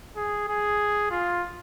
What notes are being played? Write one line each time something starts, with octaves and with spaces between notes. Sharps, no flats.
G#4
G#4
F4